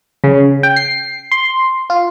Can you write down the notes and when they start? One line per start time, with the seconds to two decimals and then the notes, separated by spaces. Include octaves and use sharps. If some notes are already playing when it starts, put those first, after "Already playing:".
0.24 C#3
0.63 G5
0.76 C7
1.31 C6
1.90 F4